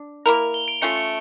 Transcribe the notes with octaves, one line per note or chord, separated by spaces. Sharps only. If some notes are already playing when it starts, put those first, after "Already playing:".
Already playing: D4
A#3 E4 A#4 F7
G7
D7
A3 C#4 F4 C#7
C#7